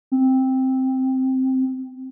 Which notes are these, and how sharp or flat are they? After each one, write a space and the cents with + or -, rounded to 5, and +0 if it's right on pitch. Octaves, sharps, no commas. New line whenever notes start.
C4 +0